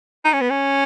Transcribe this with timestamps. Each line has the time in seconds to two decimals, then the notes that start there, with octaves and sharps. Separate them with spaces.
0.25 D#4
0.33 C#4
0.41 B3
0.50 C#4